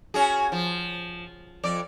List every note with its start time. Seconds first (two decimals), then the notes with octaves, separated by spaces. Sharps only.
0.14 C#4 F#4 G#4
0.52 F3
1.64 F2 D5